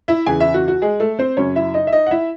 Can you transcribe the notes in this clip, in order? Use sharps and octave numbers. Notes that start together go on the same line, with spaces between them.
E4 E5
E2 C#3 E3 G#4 G#5
E4 E5
F#4
F#4
G#3 G#4
A3 A4
C4 C5
F#2 C#3 F#3 C#4 C#5
E4 E5
D#4 D#5
E5
D#4 D#5
F#5
E4 E5